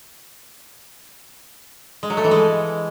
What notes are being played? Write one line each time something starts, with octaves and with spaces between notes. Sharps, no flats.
G#3
F#3
A3
E3
G#3